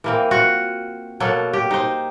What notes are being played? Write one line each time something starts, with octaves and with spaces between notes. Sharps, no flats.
E3 A#3 C4
F4 F#4
B2 F#3 A#3 A4
G4
D#4 C5